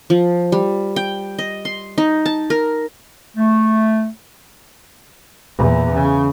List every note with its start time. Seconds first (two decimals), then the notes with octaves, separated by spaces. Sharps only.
0.10 F3
0.52 G3
0.96 G5
1.39 D#5
1.65 C6
1.98 D#4
2.26 A5
2.50 A#4
3.37 A3
5.58 E2 A#2
5.94 C#3